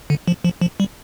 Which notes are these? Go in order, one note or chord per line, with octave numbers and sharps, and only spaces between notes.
D3
F3
F3
F3
G3